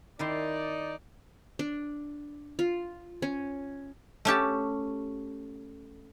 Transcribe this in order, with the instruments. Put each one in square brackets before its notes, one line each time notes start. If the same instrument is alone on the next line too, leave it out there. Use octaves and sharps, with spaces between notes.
[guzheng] D#3 E4 C6 [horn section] D#4 D5
[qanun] D4
F4
C#4
[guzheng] A3 C#4 G4 A5